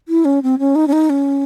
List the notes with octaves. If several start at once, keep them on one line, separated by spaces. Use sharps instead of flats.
E4
C#4
C4
C#4
D#4
C#4
D#4
C#4